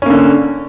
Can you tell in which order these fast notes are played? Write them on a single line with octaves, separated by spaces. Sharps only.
C#4 A#3 D3